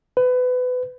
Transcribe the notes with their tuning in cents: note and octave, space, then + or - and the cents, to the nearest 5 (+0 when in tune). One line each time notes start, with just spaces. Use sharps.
B4 +25